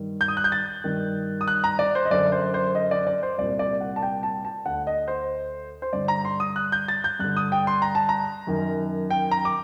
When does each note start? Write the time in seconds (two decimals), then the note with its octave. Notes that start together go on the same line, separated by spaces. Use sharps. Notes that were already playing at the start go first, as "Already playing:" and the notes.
Already playing: G2 D#3
0.21 G6
0.28 D#6
0.37 F#6
0.44 G6
0.52 A6
0.84 G2 D#3
1.41 D#6
1.48 F#6
1.64 A#5
1.79 D5
1.95 C5
2.05 D#5
2.11 F#2 D3 D5
2.32 C5
2.54 C5
2.75 D#5
2.91 D5
3.07 D5
3.23 C5
3.38 C2 A#2 D5
3.59 D5
3.81 F#5
3.96 A5
4.02 G5
4.23 A5
4.45 A5
4.66 D2 D3 F#5
4.87 D#5
5.08 C5
5.82 C5
5.93 G2 D3 D5
6.08 A#5
6.25 C6
6.40 D#6
6.56 F#6
6.72 G6
6.88 A6
7.04 G6
7.19 G2 D3 F#6
7.37 D#6
7.52 G5
7.67 C6
7.82 A#5
7.95 A5
8.09 A#5
8.47 F#2 D#3
9.10 G5
9.31 A#5
9.45 D6